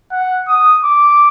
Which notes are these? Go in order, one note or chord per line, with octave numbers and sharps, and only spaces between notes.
F#5
D#6
D6